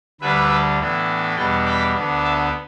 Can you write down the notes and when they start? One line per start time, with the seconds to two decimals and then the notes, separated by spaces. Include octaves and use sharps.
0.21 D2 D3 G3 D4 B4 E5
0.79 A2 E3 B3 D4
1.36 E2 B2 G3 B3 D4 D5 G5
1.66 G5 B5
1.94 D2 D3 B3 D4
2.24 E5 A5